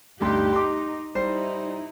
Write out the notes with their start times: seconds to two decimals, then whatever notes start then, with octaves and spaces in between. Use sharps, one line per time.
0.21 D2 G2 D#4 G4 C6
0.53 D#4 C6 D6
1.15 G3 D#4 E4 C5 C7